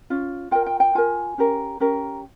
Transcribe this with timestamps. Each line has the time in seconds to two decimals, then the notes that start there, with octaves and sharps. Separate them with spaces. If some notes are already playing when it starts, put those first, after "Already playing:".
0.10 C#4 F4
0.51 F4 A#4 G5
0.66 G5
0.80 G5
0.95 F4 A#4 G#5
1.38 C#4 G4 A#4
1.80 C#4 G4 A#4